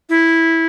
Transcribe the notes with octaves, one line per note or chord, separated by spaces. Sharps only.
E4